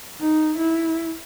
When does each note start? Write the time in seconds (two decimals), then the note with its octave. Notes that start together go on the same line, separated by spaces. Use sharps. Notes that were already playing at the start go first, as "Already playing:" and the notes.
0.20 D#4
0.58 E4